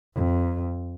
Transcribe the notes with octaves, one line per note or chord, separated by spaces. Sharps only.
F2